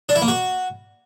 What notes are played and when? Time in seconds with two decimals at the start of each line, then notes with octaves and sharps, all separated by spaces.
0.09 D4
0.15 E4
0.22 A#3
0.28 F#4